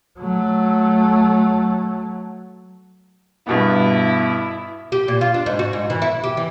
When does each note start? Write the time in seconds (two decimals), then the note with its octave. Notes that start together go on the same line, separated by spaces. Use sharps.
0.19 F#3 A3
3.47 G2 B2 B3 E4
4.92 G4
5.08 A#2
5.21 F4
5.34 D4
5.46 G#2
5.59 F#4
5.73 G#2
5.90 E3
6.02 E4
6.24 G4
6.37 E3